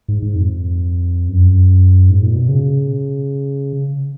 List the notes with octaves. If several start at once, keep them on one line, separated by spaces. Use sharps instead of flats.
G#2
G#2
F2
F#2
G#2
A#2
B2
C#3